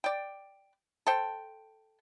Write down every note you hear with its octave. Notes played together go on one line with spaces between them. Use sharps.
D5 G5
A4 C5 G5